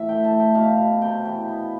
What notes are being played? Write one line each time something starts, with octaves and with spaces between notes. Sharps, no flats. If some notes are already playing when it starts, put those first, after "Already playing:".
Already playing: A2 E3 E5
A3 G5
A5
A3
G5
B2 F5
B2
C3 G5
E3 G5
B3